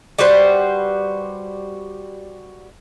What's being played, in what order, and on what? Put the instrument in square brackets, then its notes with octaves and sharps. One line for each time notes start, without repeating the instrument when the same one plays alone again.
[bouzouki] G3 F#4 B4 C5